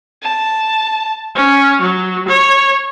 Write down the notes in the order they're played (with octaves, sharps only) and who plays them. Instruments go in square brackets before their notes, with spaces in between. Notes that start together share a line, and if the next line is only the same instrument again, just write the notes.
[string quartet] A5
C#4
F#3
C#5